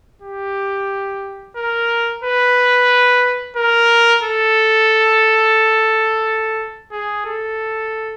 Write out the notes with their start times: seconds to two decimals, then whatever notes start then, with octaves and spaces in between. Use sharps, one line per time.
0.22 G4
1.57 A#4
2.24 B4
3.57 A#4
4.23 A4
6.92 G#4
7.26 A4